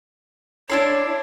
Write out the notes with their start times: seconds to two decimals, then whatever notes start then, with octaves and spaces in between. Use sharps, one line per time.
0.70 D4 E4 C#5 C6